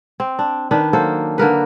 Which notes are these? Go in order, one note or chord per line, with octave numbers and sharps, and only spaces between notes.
C4
D4
D#3 D4 B4
F#3 A#3 A4 C5
D3 A#3 A#4 B4